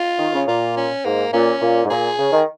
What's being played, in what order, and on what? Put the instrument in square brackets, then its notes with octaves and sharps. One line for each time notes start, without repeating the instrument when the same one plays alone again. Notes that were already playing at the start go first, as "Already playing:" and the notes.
Already playing: [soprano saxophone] F4
[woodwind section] D#3
C#3
[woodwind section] A#2 [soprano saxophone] F4
[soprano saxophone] C#4
[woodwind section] G#2 [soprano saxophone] A#3
[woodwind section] A#2 [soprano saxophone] C#4
[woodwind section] A#2
G#2
[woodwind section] A#2 [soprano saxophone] G#4
[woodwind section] C#3
D#3